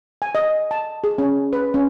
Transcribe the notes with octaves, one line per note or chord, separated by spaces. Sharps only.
G#5
D#5
A5
G#4
C#4
B4
C#4